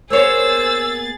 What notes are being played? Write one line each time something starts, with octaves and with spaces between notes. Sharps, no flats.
A#3 B3 G#4 C5 C#5 E6 A6